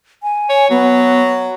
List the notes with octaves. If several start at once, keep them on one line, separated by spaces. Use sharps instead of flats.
G#5
C#5
F#3 B3